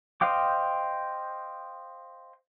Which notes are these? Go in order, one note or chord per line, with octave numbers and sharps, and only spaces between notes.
C5 D#5 F5 G5 D6